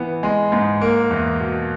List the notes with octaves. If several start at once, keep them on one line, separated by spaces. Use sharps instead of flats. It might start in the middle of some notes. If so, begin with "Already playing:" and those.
Already playing: E3 B3
G#3
G#2
A#3
E2
B2